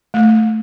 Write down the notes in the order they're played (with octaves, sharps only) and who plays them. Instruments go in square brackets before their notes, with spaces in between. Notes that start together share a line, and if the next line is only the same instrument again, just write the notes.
[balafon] A3